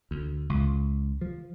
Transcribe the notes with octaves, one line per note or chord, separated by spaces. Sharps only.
D2
C#2
F3